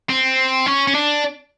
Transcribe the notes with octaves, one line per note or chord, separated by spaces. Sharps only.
C4
C#4
C#4
D4